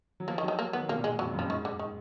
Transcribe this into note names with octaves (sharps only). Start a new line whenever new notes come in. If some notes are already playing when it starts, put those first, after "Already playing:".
F#3
F3 A#3
D#3
F#3
D#3
A#3
D#3 B3
B2 A#3
A#2
G#3
G#2
F2 F#3
F#2
F3
G#2 D#3
D3
D#3